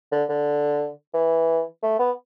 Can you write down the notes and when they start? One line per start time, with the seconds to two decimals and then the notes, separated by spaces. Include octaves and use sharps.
0.12 D3
0.29 D3
1.14 E3
1.83 A3
1.99 B3